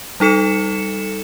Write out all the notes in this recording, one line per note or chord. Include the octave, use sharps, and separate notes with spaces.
G3 D#4 A4 C#7 E7